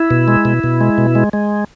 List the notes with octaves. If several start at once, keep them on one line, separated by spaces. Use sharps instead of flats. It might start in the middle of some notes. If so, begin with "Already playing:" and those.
Already playing: E4
B2
G#3
B2
B2
G#3
B2
G#3
G#3